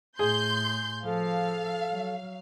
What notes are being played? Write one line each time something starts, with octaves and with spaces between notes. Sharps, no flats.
A2 G#4 C6 G6
F3 A4 F5
F#3